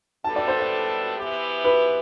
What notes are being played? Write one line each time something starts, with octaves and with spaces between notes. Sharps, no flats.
A2 G3 B3 D4 A4 A5
D5
C5
C5
E3 B3 E4 G4
B4